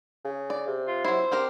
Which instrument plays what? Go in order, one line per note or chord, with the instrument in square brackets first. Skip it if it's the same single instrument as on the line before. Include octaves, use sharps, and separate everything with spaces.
[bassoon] C#3
[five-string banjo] D5
[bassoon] C3
[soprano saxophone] F4
[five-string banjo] F#3 E4 [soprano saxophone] C5
[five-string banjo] C4 G4 A#4